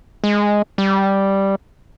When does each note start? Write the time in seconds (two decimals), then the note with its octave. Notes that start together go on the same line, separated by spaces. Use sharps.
0.24 G#3
0.78 G3